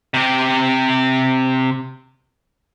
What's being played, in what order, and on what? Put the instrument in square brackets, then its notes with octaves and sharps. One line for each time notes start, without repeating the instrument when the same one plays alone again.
[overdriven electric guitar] C3 G4